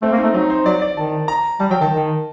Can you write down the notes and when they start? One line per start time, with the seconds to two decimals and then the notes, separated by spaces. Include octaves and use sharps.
0.02 A3 C4
0.12 A#3
0.18 D#4
0.23 A3
0.34 F#3 D#4
0.50 C5
0.65 F#3 D5
0.82 D5
0.97 D#3 A5
1.28 A#5
1.60 G3 A5
1.70 F#3 G5
1.81 D#3 A5
1.92 D#3